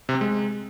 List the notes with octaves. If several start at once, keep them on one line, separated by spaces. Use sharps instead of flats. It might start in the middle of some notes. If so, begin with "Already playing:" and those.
C3
C4
G#3